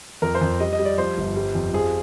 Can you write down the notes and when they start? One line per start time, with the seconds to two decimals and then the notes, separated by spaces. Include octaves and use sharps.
0.22 F2 A#4
0.35 C5
0.41 F2
0.60 G3 D#5
0.73 D#5
0.79 G3
0.85 D5
0.98 F3 C5
1.18 G1
1.36 G3
1.55 F2
1.74 F3 G#4